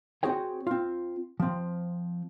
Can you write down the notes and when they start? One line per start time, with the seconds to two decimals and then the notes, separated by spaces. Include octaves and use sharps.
0.23 C4 C#4 F#4 G#4 C#5 G5
0.67 C4 F4
1.40 F3 C4